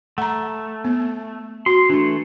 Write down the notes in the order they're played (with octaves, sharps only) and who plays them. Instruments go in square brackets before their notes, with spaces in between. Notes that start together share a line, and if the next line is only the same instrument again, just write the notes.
[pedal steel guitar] A3 [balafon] F#5 A#5
[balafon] B3
[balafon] F#4 [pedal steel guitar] C6
[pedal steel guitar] E3 A3 [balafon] D4